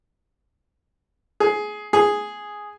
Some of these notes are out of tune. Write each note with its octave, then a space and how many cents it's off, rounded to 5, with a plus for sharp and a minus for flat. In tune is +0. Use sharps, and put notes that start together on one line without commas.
G#4 +15
G#4 +0